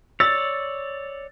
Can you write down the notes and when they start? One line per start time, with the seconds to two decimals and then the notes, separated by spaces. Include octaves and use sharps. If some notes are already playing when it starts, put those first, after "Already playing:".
0.20 C#5 D5 E6 A6